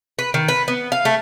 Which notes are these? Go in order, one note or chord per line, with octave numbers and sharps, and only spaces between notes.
B4
D#3
B4
B3
F5
A3